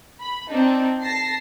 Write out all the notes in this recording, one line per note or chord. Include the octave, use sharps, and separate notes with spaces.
B5
C4 D4 D#4
A5 A#6 C7